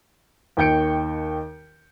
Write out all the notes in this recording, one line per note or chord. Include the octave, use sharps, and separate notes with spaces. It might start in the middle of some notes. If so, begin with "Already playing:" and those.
D#2 D#3 G5 G6 C#7 D7